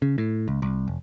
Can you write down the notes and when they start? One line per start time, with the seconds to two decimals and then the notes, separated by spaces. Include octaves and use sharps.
0.02 C#3
0.18 A2
0.48 C#2
0.62 C2
0.88 F1